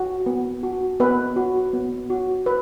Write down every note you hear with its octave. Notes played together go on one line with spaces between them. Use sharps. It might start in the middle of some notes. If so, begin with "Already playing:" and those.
Already playing: F#4
B3
F#4
B3 B4
F#4
B3
F#4
B4